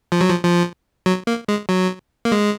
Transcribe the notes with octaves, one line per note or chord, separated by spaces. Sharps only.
F3
F#3
F3
F3
F#3
A#3
G#3
F#3
A#3
G#3